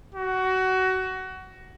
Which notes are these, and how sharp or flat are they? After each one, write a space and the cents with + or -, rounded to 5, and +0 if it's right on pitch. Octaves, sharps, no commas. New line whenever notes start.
F#4 +20